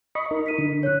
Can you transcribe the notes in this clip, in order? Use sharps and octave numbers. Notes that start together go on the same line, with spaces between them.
D#5 B5 C#6
D#4 A#4
B6 D#7
D3
C#5 F#6